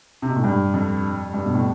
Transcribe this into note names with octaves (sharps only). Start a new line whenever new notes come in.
C3
B2
A2
G2
F2
G2
B2
A2